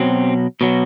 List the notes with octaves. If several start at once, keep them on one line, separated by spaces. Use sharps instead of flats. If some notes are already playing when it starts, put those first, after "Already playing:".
Already playing: B2 F#3 C4
B2 F#3